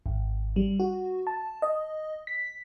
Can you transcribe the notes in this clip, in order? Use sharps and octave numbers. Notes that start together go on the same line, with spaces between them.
G#1
G3
F#4
A5
D#5
B6